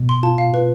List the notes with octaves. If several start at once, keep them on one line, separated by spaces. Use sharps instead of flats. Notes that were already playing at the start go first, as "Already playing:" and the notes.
Already playing: B2
C6
F4 A5
F5
F4 B4